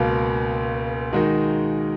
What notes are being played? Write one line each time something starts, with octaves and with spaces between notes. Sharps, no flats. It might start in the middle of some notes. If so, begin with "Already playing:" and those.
Already playing: C#2 B2 A#3
D#3 G#3 D#4 F#4 A#4